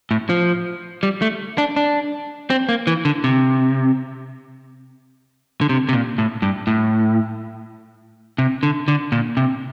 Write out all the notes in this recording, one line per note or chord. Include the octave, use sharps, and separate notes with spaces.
A2
F3
G3
A3
D4
D4
C4
A#3
E3
D3
C3
D3
C3
C3
A#2
A2
G2
A2
C3
D3
D3
A#2
C3